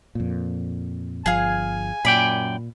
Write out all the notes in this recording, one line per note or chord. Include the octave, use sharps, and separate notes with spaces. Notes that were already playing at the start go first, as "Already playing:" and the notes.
F2 A#2
G1 F3 G#4 F5 G#5
F#2 A#2 D5 G5 B5